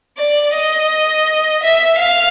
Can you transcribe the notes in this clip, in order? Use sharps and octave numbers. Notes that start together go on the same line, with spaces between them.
D5
D#5
E5
F5